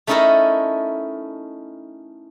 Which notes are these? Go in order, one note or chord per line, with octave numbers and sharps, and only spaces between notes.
A3 C#4 D#4 E4 A4 A#4